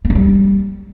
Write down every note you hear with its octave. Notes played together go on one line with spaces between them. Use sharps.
B3
F#2
G3